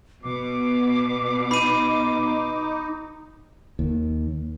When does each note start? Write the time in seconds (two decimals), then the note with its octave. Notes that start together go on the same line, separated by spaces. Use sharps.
0.23 B2 D6
1.51 D#4 B5 D#7
3.79 D#2